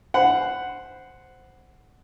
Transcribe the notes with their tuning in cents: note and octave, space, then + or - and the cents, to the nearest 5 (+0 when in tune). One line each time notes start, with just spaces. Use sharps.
C5 +0 F#5 +0 B5 +15